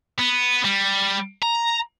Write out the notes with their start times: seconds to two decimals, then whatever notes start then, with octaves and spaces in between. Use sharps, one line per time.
0.19 B3
0.65 G3
1.43 A#5